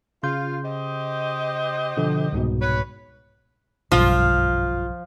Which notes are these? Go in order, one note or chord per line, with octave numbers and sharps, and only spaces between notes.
C#3 F4 C6 G6
G4 C5 D#5
B2 D3 F3
C2 G#2 B2
B4 C#5
F#1 B1 G2 F3 F4